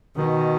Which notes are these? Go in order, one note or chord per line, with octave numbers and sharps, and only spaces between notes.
B2 D#3